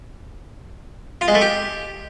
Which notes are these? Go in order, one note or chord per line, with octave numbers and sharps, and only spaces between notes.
F4
G#3
A3
G4